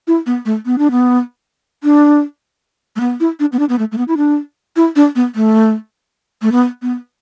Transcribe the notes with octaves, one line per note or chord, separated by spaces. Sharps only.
E4
B3
A3
B3
D4
B3
D4
A3
B3
E4
D4
B3
D4
B3
A3
A3
B3
E4
D4
E4
D4
B3
A3
A3
B3
B3